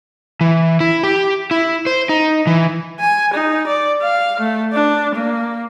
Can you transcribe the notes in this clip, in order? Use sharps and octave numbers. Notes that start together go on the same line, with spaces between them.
E3
E4
G4
E4
C5
D#4
E3
G#5
D#4
D5
F5
A3
D4
A#3